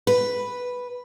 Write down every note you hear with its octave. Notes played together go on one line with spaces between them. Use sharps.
B4